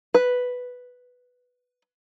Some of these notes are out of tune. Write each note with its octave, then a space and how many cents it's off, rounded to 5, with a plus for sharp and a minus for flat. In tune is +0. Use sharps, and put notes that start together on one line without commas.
B4 +0